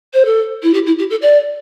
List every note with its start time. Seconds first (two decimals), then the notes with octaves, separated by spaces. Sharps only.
0.14 C5
0.25 A4
0.63 E4
0.74 G4
0.86 E4
0.99 G4
1.10 A4
1.22 D5